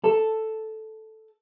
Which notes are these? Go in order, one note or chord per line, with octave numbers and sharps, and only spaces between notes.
A4